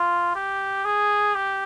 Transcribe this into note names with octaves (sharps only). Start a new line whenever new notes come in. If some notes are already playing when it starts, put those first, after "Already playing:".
Already playing: F4
G4
G#4
G4